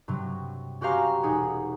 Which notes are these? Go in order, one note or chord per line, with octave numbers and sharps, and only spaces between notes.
G2 C3 F#3
C#4 F#4 G4 C5 F5 A#5
E1 D#4 G#4 F#5